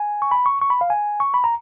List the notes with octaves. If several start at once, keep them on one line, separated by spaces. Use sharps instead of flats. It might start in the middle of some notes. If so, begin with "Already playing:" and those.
Already playing: G#5
C#6
B5
C#6
C#6
B5
F5
G#5
C#6
B5
A#5